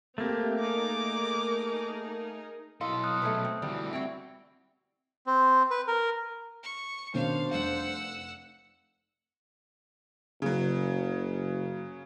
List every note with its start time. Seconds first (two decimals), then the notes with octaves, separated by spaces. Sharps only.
0.18 A3 A#3 C4 G4
0.60 D#4 G#4 A#4 D6
2.81 B1 E4 A4 D#5 F5 C6
3.04 D#6 F6 F#6
3.22 A3 G#4 B4
3.44 C4
3.62 D2 E3 G3
3.93 G3 C4 E4 F#4 G5
5.26 C4
5.71 B4
5.88 A#4
6.63 C#6
7.14 B2 D#3 C#4 D4 C5 F5
7.51 F1 F5 F#5 E6
10.42 F#1 C#3 F#3